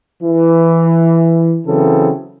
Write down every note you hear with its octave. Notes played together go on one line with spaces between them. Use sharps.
E3
C#3 E3 F#3 C4 A4